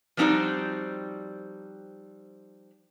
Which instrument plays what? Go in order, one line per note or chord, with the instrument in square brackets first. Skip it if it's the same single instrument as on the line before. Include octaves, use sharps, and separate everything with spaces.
[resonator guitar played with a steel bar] F3 G3 C4 D#4 F#4 D5